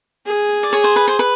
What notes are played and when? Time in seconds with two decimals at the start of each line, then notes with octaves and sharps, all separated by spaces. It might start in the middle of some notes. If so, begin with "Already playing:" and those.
0.26 G#4
0.63 D5
0.73 G#4 C#5
0.84 C5
0.96 B4
1.08 C5
1.19 B4